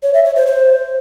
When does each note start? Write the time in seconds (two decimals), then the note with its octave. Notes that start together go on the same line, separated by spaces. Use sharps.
0.03 C#5
0.14 E5
0.25 C#5
0.36 C5
0.47 C5